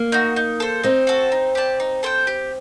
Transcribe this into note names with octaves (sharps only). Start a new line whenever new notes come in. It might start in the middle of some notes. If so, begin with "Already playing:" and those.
Already playing: A#3
D#4 F#4
D#4
A4 C5
C4 D#4
F#4 A4
D#4
G4 D5 A5
D#4
A4 C5 G5
G4